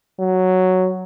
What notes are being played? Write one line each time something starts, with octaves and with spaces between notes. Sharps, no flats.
F#3